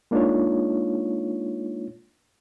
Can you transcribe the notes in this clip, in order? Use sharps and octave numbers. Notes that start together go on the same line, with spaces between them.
G#3 A#3 D4 D#4 F4 C#5